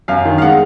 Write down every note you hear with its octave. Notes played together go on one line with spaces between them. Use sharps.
F#2 F5
D#3
F5
G#3 F#5